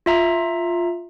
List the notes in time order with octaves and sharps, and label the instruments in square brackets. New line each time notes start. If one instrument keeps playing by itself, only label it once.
[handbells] F4 E5 A#5